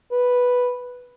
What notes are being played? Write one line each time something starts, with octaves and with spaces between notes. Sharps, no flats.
B4